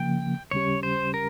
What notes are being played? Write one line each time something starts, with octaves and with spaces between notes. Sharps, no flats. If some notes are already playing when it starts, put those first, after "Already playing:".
Already playing: C#3 F3 A#3 G5
D#2 C#3 G3 C#4 G4 C#5
C5
A#4